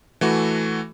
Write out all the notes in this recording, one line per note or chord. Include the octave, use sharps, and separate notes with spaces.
E3 A3 F#4